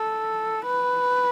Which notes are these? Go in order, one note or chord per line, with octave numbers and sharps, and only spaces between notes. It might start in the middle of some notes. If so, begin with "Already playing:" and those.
Already playing: A4
B4